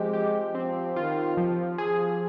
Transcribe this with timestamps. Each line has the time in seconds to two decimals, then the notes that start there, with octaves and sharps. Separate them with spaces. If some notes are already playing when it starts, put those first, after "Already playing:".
Already playing: F3 G#3 C4 G4
0.13 G4
0.54 F3 C4
0.96 D#3 F4
1.37 F3
1.78 G#4